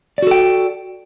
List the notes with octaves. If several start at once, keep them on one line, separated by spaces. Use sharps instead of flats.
F#4 A4 D5 G5